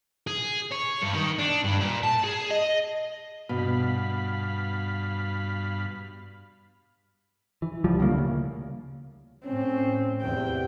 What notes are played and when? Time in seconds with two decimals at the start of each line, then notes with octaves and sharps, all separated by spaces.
0.27 G#4
0.71 C#5
1.02 G2
1.13 D#3
1.39 D4
1.64 G2
1.80 A#2
2.03 A5
2.24 G#4
2.50 D#5
3.49 G2 B2 F5 B5
7.62 E3
7.84 C#2 F3 G3
8.00 D2 C#3 A#3
8.18 C#3
9.46 A2 C4 C#4
10.22 E2 C3 G5